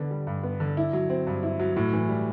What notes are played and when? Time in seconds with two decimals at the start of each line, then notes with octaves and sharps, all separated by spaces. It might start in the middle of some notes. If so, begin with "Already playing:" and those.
Already playing: D3 B3
0.11 G3
0.27 G2
0.43 B3
0.60 D3
0.77 E4
0.93 F#3
1.10 C4
1.27 G2
1.43 E4
1.59 F#3
1.77 A2
1.93 E3
2.09 G3